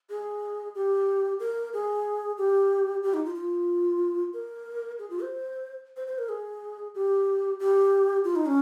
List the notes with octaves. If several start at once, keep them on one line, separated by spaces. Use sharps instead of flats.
G#4
G4
A#4
G#4
G4
G4
D#4
F4
F4
A#4
G#4
F4
C5
C5
C5
A#4
G#4
G4
G4
F4
D#4
C#4